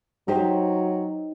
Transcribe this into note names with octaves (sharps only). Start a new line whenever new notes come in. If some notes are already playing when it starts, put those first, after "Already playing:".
F#3 D#4 G4 C5